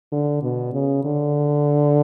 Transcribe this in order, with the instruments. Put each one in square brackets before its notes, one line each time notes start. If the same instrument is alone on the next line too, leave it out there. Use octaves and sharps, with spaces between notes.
[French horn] D3
B2
C#3
D3